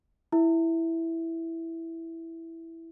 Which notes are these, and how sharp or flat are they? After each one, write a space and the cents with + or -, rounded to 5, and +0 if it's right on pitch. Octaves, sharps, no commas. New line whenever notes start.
E4 +0 E5 +0